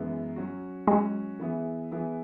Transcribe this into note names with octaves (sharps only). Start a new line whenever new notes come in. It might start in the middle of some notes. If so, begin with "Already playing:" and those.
Already playing: F#2 E3 G#3 B3 E4
F#3 C#4 F#4
F#3 G#3 C#4 F#4
E3 B3 E4 G#4
E3 B3 E4 G#4